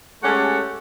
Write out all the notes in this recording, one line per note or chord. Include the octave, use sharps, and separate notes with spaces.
G#3 A3 C#4 G4 A4 F#5